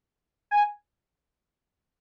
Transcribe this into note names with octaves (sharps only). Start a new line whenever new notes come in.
G#5